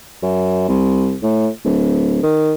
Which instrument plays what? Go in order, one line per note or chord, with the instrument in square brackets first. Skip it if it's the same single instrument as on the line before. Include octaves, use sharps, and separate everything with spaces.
[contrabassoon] F#2
C2
A2
D1
D#3